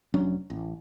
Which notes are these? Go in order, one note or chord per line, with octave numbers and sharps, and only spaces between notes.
F1 F#3 C#4 D4
A1